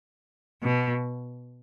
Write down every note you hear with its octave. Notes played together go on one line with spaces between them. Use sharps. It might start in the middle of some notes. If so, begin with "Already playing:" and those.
B2